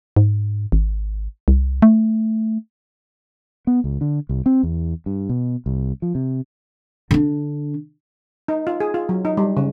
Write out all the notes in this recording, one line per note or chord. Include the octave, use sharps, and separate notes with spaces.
G#2
G#1
C2
A3
B3
C#2
D3
C2
C4
E2
G2
B2
C2
F3
C3
D3 D4
D#4
F4
G#4
F4
F#3
D#4
G3
C#3